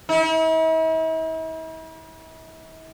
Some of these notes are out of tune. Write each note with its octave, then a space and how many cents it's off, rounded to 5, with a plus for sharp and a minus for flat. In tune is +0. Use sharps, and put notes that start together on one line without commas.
E4 -45